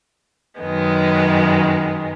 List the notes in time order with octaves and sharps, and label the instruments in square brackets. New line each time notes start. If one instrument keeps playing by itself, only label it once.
[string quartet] F#2 D#3 G#3 B3